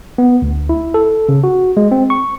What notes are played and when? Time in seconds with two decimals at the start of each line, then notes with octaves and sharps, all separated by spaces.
0.18 B3
0.42 D2
0.69 E4
0.94 A4
1.29 C#3
1.44 F#4
1.77 G#3
1.91 C4
2.10 C#6